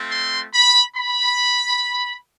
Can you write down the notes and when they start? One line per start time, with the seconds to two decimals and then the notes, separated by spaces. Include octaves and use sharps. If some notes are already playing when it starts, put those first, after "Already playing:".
Already playing: A3 C4 F4
0.11 C6
0.54 B5
0.96 B5